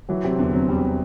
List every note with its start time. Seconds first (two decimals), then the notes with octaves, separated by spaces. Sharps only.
0.09 E3 F#3
0.24 C3 C4
0.38 E2 D3
0.53 F#3 C4
0.68 E2 G3